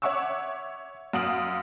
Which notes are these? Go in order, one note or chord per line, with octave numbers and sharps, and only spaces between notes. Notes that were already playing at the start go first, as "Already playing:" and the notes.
C#5 E5 F#5 C#6 D6 E6
F#2 F5 F#5 D#6 D7 F#7